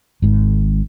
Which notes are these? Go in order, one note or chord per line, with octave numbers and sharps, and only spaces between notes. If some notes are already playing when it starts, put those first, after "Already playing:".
G#1 G#2